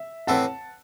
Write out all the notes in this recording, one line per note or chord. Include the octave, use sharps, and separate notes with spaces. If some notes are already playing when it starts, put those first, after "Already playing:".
Already playing: E5
A2 E3 C4 E4 F#5 A5